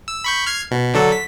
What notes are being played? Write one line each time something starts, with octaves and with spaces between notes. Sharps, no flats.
E6
B5 C#6 G6
F6 G#6 C7
B2
D3 F#3 A4
B6